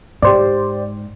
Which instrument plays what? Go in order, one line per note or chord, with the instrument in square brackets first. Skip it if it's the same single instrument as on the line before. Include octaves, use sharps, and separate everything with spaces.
[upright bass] G#2 [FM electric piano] G4 C5 D5